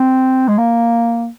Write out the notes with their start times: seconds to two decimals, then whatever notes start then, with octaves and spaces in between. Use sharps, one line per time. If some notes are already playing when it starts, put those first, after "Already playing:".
Already playing: C4
0.48 G#3
0.58 A#3